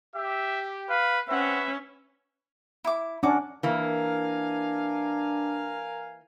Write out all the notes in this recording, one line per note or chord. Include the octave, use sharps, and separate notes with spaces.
G4 E5
B4 F5
C4 C#4 B4 E5 F#5
E4 D6
C#4 D4 F#4 D6
E3 A#3 D4 A#4 F5 G#5